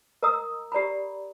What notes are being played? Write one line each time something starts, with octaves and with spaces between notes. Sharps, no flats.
A#4 D#5 A#5 D#6 E6
G4 D5 A#5 B5